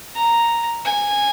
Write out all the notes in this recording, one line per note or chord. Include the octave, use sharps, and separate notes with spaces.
A#5
G#5